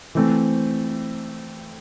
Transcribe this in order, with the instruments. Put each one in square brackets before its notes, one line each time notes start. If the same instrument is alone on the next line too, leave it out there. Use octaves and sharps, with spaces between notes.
[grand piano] E3 A3 C4